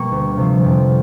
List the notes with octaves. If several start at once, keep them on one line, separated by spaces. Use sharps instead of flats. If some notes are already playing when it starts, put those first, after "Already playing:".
Already playing: B2 G3 A#3 C#6
D2
C3 F3
F2